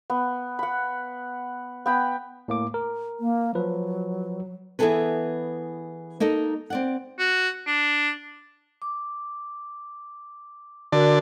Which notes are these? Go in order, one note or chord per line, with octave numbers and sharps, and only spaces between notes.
B3
F#5 B5
B3 G5 B5
A2 A#3 D6
A#4
A#3
F3 F#3 B4
E3 B3 E4 G#4 A4 B4
A#3 D#4 A4 D#5
C4 D5 F#5
F#4
D4
D6
D3 F#4 A#4